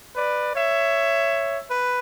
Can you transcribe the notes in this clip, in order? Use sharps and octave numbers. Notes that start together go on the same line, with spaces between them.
B4 D5
C#5 E5
B4